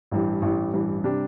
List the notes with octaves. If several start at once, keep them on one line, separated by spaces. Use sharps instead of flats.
A1 G2 E3
A1 G2 E3
A1 G2 E3
C3 G3 D4